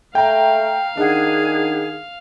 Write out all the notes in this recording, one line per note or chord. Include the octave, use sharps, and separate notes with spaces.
A3 F5 G5 A#5
D#3 D4 G#4 F#5